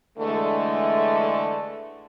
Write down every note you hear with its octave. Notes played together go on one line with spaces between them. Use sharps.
D3 E3 G#3 A3